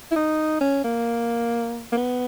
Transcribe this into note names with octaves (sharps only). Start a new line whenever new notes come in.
E4
D#4
C#4
A#3
A#3
B3